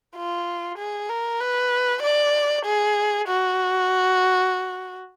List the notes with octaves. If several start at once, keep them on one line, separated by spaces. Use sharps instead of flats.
F4
G#4
A#4
B4
D5
G#4
F#4